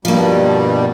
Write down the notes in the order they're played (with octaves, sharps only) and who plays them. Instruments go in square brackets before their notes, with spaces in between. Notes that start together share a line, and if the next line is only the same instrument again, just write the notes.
[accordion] G2 B2 G3 [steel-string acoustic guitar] F3 A#3